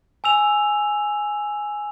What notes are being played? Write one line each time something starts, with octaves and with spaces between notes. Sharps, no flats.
G#5 E6 F7